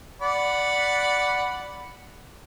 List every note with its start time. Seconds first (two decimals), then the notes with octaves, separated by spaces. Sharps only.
0.22 D5 F#5 B5